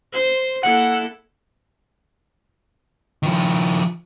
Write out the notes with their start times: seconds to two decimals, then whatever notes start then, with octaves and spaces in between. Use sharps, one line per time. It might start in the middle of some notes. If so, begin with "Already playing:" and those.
0.12 C5
0.63 A#3 E4 A4 F#5
3.23 D#3 F3